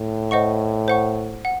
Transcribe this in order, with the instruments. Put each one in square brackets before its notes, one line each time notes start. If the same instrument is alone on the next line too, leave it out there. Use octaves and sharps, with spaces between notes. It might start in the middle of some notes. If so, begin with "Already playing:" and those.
Already playing: [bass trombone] A2
[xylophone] C5 D#5 F#5 C#6
C5 F#5 C#6
F#5